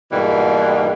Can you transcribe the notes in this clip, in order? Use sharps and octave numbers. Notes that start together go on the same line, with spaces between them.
G#2 B2 E3 G3 A#3